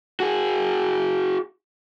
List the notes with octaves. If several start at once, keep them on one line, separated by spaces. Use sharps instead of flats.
F#4 G#4